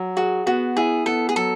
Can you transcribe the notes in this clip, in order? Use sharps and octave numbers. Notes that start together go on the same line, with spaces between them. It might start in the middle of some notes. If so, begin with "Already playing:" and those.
Already playing: F#3
F#4 G#4
B3 F#4
E4 G#4
B3 A4
G#4
F#3 A4